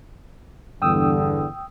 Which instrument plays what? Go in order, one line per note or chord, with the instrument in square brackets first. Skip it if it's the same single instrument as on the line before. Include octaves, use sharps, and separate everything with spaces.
[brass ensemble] E2 G2 D3 [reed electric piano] G5 D#6 E6